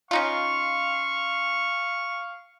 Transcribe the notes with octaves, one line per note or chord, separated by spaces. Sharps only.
C#4 D#4 F4 F5 C#6